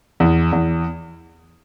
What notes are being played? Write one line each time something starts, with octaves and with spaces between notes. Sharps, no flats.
E2
E2